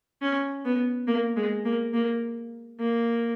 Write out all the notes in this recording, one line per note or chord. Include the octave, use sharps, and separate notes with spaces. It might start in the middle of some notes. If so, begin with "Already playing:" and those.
C#4
B3
A#3
G#3
A#3
A#3
A#3